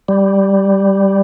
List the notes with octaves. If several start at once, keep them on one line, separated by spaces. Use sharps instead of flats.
G3